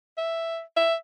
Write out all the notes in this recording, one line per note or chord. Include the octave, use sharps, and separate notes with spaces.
E5
E5